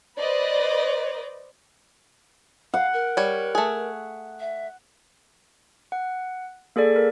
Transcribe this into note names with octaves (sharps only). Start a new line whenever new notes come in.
B4 C5 D5 D#5
F5 F#5
A#4
G3 C#5
A3 G#4
E5
F#5
A#3 G#4 A4 D5
A#4